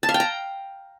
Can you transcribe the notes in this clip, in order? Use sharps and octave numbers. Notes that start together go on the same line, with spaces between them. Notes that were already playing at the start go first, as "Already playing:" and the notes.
A5
F5
G5
A#5